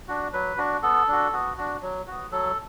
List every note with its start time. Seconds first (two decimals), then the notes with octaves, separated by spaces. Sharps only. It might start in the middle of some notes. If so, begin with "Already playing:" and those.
0.08 D4 F#4
0.33 F#3 B4
0.58 D4 F#4
0.83 B3 A4
1.08 D4 F#4
1.33 B3 F#4
1.57 D4 F#4
1.82 F#3
2.07 B3 F#4
2.32 F#3 A4